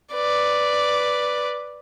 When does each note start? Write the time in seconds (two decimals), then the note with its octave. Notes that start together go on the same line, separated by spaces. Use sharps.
0.14 B4 D5